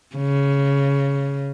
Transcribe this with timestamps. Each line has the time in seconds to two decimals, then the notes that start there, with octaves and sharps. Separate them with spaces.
0.16 C#3